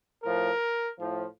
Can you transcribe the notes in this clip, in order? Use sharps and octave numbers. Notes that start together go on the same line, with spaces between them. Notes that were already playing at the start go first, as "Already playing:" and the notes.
A2 F3 A#4
A2 F3